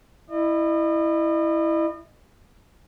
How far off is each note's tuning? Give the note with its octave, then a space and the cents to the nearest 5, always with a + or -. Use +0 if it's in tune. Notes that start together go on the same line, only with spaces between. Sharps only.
E4 +0 D#5 -40